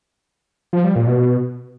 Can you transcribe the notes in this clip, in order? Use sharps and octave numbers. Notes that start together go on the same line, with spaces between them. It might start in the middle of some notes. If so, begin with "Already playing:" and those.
F3
G3
A#2
B2